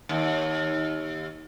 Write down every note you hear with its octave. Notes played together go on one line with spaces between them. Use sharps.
D#2